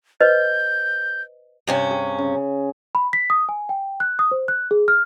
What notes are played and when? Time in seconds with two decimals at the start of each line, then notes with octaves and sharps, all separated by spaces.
0.20 B4 C5 D#5 G6
1.67 G2 C3 C#4
1.91 G#4
2.19 C#3
2.95 B5
3.13 B6
3.30 D#6
3.49 G#5
3.69 G5
4.00 F#6
4.19 D#6
4.31 C5
4.48 F#6
4.71 G#4
4.88 F6